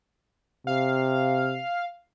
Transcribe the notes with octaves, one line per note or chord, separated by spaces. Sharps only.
C3 F5